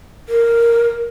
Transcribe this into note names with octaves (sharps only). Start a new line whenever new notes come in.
A#4